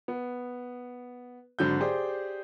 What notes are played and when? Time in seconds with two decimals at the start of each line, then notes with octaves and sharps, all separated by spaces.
0.08 B3
1.59 G#1 D3 F#3 G6
1.80 G4 G#4 C5 D5